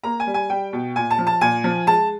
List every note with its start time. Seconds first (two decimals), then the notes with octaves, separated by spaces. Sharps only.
0.03 A#3 A#5
0.20 G#5
0.27 G3
0.34 G#5
0.50 G3 G5
0.73 B2
0.96 A#2 G#5
1.11 A5
1.19 F3
1.27 A5
1.41 A#2 G#5
1.64 F3
1.87 G#3 A5